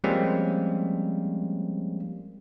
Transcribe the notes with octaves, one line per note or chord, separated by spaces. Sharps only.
F3 G3 G#3 A#3 C4 C#4